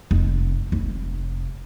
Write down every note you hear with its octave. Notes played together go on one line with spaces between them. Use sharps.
F1
F1